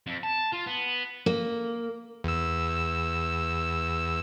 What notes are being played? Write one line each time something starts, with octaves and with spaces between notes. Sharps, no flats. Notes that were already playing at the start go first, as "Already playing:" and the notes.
F2
A5
F4
B3
A#3
E2 E6